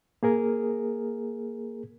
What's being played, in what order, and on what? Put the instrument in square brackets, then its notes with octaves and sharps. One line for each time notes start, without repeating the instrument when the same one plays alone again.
[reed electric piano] A#3 G#4 A#4